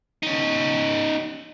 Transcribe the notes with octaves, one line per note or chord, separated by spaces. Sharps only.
C#4 D#4